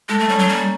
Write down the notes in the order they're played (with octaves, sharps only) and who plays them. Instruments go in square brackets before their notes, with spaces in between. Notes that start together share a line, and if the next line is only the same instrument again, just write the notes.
[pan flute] G#3 [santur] A4
[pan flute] A3
[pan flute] G3 [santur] C#4
[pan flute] F#3
[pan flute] G3 [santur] A#3